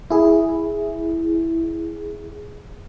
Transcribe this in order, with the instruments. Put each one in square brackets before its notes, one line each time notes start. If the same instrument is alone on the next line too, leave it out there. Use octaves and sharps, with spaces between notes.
[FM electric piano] E4 G#4